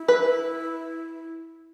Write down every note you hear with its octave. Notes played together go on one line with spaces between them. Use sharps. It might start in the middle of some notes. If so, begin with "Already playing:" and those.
Already playing: E4
B4